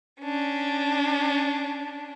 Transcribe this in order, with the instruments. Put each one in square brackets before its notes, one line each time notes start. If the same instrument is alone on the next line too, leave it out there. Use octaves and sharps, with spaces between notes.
[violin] C#4 D4